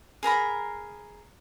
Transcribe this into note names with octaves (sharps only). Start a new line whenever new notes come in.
G#4 A#4 A#5 B5